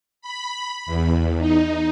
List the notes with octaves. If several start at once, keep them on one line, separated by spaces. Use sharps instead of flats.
B5
E2
D#4